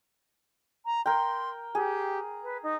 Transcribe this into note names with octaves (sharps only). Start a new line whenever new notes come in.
A#5
A#4 G5 C6
G4 G#4
B4
D#4